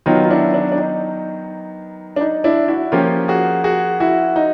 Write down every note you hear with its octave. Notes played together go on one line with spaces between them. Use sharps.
D#3 F#3 B3 D#4 F4
F4
D4 E4
D4
D4
D#4
D4
D#4
D4 E4
E4 F#4
F3 A#3 C#4 F4 G4
F#4 G#4
F#4 G#4
E4 F#4
D#4